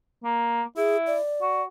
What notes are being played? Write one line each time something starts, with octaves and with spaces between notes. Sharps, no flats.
A#3
E4 G#4
D5
F#4